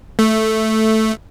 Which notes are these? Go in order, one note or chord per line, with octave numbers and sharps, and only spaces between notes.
A3